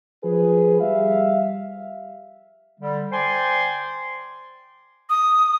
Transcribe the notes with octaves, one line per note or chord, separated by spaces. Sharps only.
F3 G#4 B4
G3 E5 F5
D3 G3
C5 D5 G5 G#5 C6
D#6